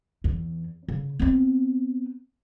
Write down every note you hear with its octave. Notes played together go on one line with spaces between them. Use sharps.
E2
C#3
B3 C4